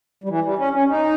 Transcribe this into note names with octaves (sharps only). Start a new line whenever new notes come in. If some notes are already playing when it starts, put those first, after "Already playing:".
G3
E3
G3
C#4
C#4
D#4